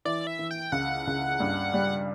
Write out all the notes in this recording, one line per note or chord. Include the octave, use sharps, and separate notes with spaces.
E3 D5
E5
E3
G5
C#2 F#5
C#2
G2
G3